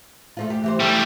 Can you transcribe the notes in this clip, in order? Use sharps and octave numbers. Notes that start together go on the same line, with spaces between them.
A3 C#4 F4
G4
E3 G4 C5
G3 A3